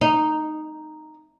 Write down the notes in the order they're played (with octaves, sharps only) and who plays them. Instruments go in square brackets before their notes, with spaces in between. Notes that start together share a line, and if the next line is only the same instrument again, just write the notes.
[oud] D#4